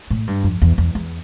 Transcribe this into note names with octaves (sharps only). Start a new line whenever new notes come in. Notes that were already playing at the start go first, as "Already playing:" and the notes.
A2
G2
F2
E2
E2
E2